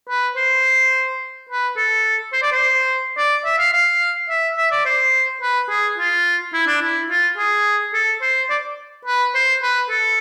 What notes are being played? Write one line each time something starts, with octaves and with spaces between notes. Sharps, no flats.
B4
C5
B4
A4
C5
D5
C5
D5
E5
F5
F5
E5
E5
D5
C5
B4
G#4
F4
E4
D4
E4
F4
G#4
A4
C5
D5
B4
C5
B4
A4